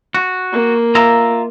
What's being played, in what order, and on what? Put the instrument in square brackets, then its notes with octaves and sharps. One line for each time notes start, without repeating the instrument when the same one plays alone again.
[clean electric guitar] F#4
[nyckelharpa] A#3
[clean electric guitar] F4 E5 A#5